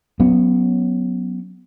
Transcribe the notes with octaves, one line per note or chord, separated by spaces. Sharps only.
F#3 B3 C#4